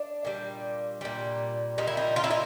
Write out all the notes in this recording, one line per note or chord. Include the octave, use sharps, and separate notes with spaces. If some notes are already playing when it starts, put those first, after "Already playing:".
Already playing: D4
A#2 G3
A#2 G3
A#2 G3 D#4
E4
D#4
F4
E4
D#4